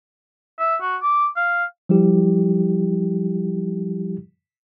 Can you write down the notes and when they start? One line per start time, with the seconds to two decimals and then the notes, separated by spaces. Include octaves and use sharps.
0.59 E5
0.81 F#4
1.02 D6
1.36 F5
1.89 F3 G3 E4 G4